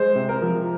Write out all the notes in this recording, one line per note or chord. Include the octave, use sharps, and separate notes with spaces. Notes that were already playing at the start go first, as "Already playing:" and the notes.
Already playing: G#3 C5
C3
A#4
F3